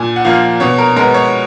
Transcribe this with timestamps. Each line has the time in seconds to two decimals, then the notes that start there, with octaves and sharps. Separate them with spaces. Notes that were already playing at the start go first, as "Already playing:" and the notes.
Already playing: A#2 G#5
0.16 F#5
0.25 F3 A#3 F5
0.60 B2 C#5
0.78 A#4
0.96 G#3 B3 A#4
1.14 C#5